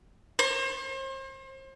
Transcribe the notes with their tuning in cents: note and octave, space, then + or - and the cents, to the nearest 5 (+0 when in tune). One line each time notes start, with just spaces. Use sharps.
C5 +40